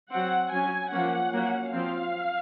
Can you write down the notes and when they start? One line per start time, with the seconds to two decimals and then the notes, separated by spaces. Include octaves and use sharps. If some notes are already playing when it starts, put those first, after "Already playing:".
0.11 F#3 C4 F#5
0.52 F#3 C#4 G#5
0.91 F3 A#3 C#4 F#5
1.33 F#3 A#3 C#4
1.73 F3 C4 F5